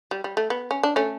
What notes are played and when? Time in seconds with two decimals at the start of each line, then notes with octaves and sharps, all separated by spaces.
0.11 G3
0.24 G3
0.37 A3
0.50 B3
0.71 C#4
0.83 D4
0.96 A3 C#4